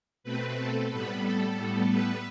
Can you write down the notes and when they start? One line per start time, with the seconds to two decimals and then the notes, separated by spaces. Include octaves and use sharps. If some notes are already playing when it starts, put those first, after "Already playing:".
0.24 B2 A3 C4 B4
0.57 A4
0.90 A2 G3 B3 B4
1.23 A4
1.56 A2 G3 B3
1.89 B4